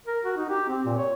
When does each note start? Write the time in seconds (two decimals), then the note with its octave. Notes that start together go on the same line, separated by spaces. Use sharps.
0.07 A#4
0.24 F#4
0.37 D#4
0.49 G4
0.69 C4
0.85 A#2
0.97 C#5